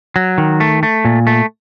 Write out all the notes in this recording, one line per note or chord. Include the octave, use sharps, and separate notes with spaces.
F#3
D#3
A3
A3
A#2
A3